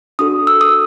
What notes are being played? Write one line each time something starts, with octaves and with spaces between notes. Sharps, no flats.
D4 F#4 A4 D#6
E6
D#6